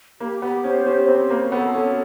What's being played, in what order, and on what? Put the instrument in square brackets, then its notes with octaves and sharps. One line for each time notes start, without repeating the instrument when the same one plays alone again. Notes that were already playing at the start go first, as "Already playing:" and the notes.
[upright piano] A#3 [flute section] G4
[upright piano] B3 [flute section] G4
[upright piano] C#4 [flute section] C5
[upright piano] C#4 [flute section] G4
[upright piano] C4 [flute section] C5
[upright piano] A#3 [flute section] F#4
[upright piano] B3 [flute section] A4
[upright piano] C#4 [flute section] F#4